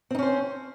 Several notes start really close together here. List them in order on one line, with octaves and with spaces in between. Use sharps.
C4 D#4 C#4 C5